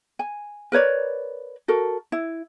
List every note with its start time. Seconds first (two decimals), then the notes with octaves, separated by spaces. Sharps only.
0.19 G#5
0.72 A#4 B4 C#5 D5
1.68 F#4 A4 A#4
2.12 E4